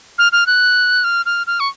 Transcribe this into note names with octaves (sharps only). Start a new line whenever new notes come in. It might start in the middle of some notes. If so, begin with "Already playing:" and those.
F6
F6
F#6
F6
F6
F6
C#6